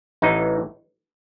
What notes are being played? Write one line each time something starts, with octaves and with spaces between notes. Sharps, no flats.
A1 A2 E3 D#4